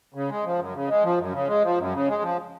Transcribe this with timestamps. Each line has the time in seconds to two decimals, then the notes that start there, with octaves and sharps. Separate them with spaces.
0.14 C#3
0.30 G#3
0.45 F3
0.59 F#2
0.74 C#3
0.88 G#3
1.04 F3
1.18 F#2
1.33 C#3
1.48 G#3
1.63 F3
1.78 F#2
1.93 C#3
2.08 G#3
2.22 F3